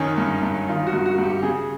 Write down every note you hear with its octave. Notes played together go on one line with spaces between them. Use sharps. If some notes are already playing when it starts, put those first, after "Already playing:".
Already playing: F#2 D#3 C#4
G2
G2
D#3 F4
F#4
G2
F#4
G2
G4
C#3 G#4